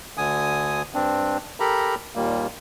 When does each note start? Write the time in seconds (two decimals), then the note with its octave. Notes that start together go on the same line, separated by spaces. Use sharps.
0.17 D2 D3 G#5 D#6
0.94 G2 C4 D4
1.60 G4 A4 A#4 A#5 B5
2.15 D#2 A#2 G3 A#3